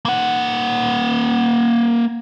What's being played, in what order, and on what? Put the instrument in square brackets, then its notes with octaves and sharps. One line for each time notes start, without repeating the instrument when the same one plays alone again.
[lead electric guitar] A#3 F#5